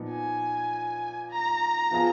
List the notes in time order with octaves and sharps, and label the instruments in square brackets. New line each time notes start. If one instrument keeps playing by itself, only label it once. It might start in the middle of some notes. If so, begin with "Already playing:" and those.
Already playing: [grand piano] A#2 F3 B3 D#4
[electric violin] G#5
A#5
[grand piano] F3 B3 F4 G#4